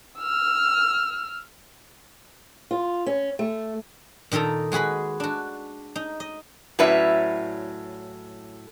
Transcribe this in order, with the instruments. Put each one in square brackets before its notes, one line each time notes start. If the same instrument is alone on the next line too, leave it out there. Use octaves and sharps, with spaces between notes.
[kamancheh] E6 F6
[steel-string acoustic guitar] F4
C#4
A3
[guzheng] A#2 D#3 D#4 A4 A#5
G#3 F#4 G#4 B4 B5
D4 F#4
D#4
D#5
[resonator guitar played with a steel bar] A2 F#3 C#4 B4 D5 E5